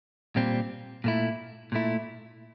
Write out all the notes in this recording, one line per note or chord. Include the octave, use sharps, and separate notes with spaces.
A#2 G3 C4
A#2 A3 E4
A#2 A3 E4